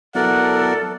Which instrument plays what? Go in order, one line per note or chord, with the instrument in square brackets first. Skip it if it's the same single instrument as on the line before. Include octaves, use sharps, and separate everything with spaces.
[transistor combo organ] F#3 B3 E4 [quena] A4 [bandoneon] A#4 D5 [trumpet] F#5